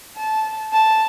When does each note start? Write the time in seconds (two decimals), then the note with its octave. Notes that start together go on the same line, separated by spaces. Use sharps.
0.17 A5
0.73 A5